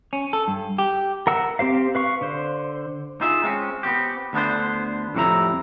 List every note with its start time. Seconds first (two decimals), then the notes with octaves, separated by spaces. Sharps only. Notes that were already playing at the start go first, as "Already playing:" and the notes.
0.13 C#4
0.33 A4
0.48 G2
0.78 G4
1.27 A#4 F#5 E6
1.59 C4 G4 C5 F5
1.95 B4 F5 C#6
2.21 D3 C5
3.21 D#4 F4 G#4 E5
3.43 G#3 C4 C#4
3.83 B3 C4 F4 G4
4.33 D2 D3 B3 D4 C5
5.14 C2 F2 A2 C3 E4 A#5